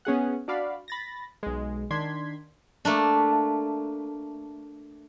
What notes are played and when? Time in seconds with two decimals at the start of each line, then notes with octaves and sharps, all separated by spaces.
0.05 B3 C#4 G#4 F#5
0.48 D4 F#4 D5 F5 B5
0.88 B5 A6 A#6
1.43 B1 G#3
1.91 D#3 D4 C6 G#6 B6
2.85 A3 A#3 D4